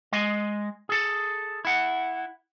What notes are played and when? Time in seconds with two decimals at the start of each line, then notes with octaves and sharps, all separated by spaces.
0.13 G#3 D#5
0.89 G#4 A4
1.65 E4 F#5